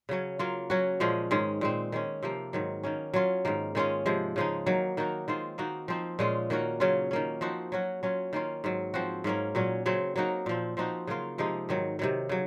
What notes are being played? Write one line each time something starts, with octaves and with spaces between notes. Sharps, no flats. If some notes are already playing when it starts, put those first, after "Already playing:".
C#3 F#3 C#4
F#3 A#3 F4
F#3 C#4 F#4
A#2 F3 G#3 C#4
G#2 D#3 G#3 C#4
A#2 G#3 C4
D#3 G#3 C#4
C3 F3 A#3
G#2 D#3 F#3
D#3 A#3 C#4
F#3 C#4 F4
G#2 D#3 A#3
D#3 G#3 C#4 F4
C3 F3 G#3
C#3 F3 G#3 D#4
D#3 F#3 A#3
D#3 A#3 D#4 F#4
D#3 G#3 C4 F4
D#3 A#3 D#4 F#4
F3 C4 D#4
A#2 G#3 C#4 F4
D#3 A#3 C#4 F#4
C#3 F#3 C#4 F4
D#3 A#3 C#4
F3 C4 D#4 F#4
F#3 C#4 F#4
F#3 C#4 F4
D#3 A#3 C#4 F4
G#2 D#3 F#3
F3 C4 F#4
G#2 F#3 A#3 C#4
A#2 F#3 C#4
C#3 F#3 C4
F#3 A#3 D#4 F#4
A#2 F3 C4
F3 C4 D#4 F#4
C#3 F#3 A#3 F4
C3 F3 G#3 D#4
G#2 D#3 F#3
C3 D#3 F#3
C#3 F#3